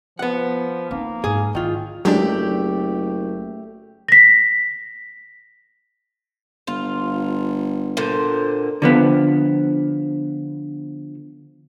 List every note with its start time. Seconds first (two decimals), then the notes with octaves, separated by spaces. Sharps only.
0.19 F3 B3 F#5
0.91 A#3 C4 D#4
1.24 G#2 G#4
1.55 D#3 E4 F4
2.05 F#1 F#3 G#3 A3 D4 G4 D5
4.08 A#6 B6
6.67 G1 F4
7.97 A#2 D3 C5
8.82 D3 F3 B3